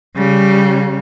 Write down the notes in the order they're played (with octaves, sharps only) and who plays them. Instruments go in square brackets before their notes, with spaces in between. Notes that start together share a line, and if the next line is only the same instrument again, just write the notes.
[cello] C#3 G3